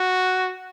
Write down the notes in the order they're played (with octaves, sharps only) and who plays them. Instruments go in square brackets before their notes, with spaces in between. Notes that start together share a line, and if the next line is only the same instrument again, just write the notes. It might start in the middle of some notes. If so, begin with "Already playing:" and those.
Already playing: [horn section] F#4